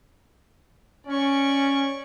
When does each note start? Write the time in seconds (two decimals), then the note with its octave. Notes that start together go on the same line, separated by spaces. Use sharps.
1.07 C#4 D5 C#6